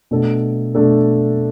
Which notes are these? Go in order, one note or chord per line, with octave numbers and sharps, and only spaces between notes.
B2 A3 D4 A4
B2 A3 D4 A4